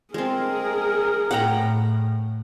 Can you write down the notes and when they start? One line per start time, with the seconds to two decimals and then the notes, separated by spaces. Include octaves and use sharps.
0.14 G#3 C4 G#4 A#4
1.31 A2 F#5 G5 A#5